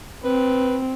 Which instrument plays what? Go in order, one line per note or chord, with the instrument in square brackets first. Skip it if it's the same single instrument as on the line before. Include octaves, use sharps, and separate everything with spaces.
[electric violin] C4 [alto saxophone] B4